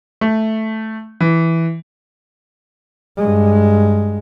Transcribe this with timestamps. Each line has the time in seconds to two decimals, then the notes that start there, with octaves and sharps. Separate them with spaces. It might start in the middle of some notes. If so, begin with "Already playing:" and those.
0.21 A3
1.20 E3
3.17 G2 G#3